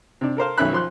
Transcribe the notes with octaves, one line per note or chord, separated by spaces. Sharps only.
C3 D4
A4 A#4 C5 F5
B1 D#3 C#4 E5 B5 F#6
F3 C6 F#6